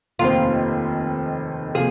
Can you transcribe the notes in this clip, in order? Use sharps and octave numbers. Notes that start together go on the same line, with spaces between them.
F1 D#2 D#3 C4 F4
C3 F3 A#3 F4 G#4